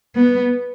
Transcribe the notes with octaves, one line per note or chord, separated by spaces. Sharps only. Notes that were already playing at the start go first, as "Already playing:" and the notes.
B3